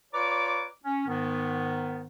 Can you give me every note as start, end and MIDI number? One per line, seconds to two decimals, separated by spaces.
0.13 0.66 65
0.13 0.66 71
0.13 0.66 73
0.13 0.66 74
0.13 0.66 82
0.13 0.66 86
0.83 1.06 61
1.07 2.07 44
1.07 2.07 51
1.07 2.07 59